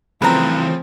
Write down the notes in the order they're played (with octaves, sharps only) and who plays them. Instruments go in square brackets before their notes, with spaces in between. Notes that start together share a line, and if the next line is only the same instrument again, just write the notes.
[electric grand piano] C#3 F3 A3 [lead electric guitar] E3 C5 [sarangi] C4 [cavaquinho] B4 A#5